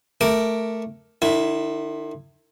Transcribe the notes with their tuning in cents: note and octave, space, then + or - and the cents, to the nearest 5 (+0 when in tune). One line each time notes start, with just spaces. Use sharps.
A3 +0 A#4 +0 D6 +0
D#3 -45 E4 +0